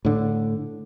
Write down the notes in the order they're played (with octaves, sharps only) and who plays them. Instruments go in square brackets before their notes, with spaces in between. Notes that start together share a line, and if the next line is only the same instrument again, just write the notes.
[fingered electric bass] A2 D3